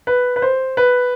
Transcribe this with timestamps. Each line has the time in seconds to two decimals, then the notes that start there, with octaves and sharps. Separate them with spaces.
0.07 B4
0.36 B4
0.42 C5
0.77 B4